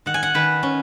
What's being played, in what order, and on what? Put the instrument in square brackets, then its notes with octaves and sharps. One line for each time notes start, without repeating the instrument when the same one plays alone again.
[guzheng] D#3 F#5
G#5
F#5
D#3 B4
C#4